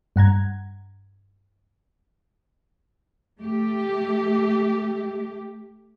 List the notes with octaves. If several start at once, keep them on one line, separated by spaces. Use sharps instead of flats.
G2 F#5 A#5 G#6
A3 G4